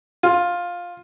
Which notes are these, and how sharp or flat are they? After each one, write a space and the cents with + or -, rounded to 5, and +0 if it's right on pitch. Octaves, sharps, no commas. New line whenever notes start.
F4 +10